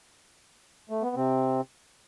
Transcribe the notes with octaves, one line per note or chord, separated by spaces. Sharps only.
A3
B3
C3 C4